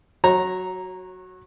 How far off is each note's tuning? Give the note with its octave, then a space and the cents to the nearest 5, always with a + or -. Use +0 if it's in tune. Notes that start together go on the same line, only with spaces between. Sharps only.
F#3 +0 C#5 -30 A#5 +0